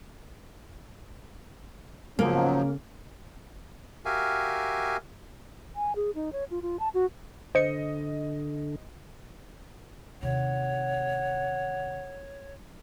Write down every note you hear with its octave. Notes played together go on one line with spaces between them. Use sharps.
G#2 C#3 F3 F#3 A#3 C#4
F#4 G4 A#4 E5 F5 G#5
G#5
G#4
D#4
C#5
F4
F4
A5
F#4
D3 C5 D#5 C#7
D#2 C3 C#5 F#5